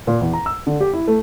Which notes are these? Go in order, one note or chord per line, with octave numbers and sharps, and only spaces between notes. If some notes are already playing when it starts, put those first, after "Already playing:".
A#2
E2
A#5
E6
D3
G4
E4
A3